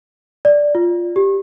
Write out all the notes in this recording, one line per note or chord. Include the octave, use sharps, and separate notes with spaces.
D5
F4
G4